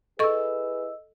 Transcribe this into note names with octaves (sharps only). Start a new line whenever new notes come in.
E4 G#4 A4 B4 D#5 C#6 E6